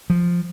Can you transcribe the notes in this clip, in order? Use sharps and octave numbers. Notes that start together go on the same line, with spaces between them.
F3